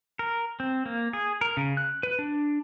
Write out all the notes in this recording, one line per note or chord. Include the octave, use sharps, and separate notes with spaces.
A#4
C4
A#3
G#4
A#4
C#3
F#6
B4
D4